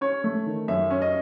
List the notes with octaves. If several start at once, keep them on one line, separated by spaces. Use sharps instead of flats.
C#4 C#5
A3
D#3
F#2 E5
C#4
D#5